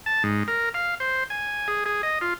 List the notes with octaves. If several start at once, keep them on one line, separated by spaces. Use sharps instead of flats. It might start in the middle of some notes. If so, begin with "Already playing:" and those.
A5
G#2
A#4
F5
C5
G#5
G#4
G#4
D#5
F4